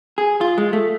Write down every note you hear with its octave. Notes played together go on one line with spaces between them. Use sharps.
G#4
F4
G#3
A3